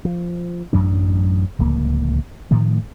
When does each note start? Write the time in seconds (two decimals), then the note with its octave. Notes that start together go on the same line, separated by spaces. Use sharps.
0.05 F3
0.73 A1 F#2 F#3 D4
1.59 D1 C#2 F3 A#3
2.51 A2 D#3 F3 A3